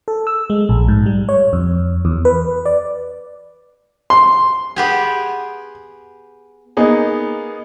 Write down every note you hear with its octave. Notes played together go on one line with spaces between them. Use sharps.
A4
E6
G#3
A#1
G#2
G3
C#5
F2
E2
B4
D5
C6
B3 G4 G#4
A#3 B3 D#4 G#4